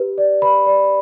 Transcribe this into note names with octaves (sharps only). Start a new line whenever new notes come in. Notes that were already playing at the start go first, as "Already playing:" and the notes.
Already playing: G4 B4
D5
B4 B5
D5